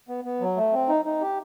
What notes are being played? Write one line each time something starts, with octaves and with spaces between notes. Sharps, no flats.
B3
B3
F#3
A3
C4
D#4
D#4
G4